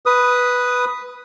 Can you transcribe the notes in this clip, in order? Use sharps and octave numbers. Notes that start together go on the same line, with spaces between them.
B4 D#6